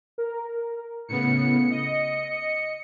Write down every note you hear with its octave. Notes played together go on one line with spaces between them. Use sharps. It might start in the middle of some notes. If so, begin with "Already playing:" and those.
A#4
A2 C#3 B3 C#7
D#5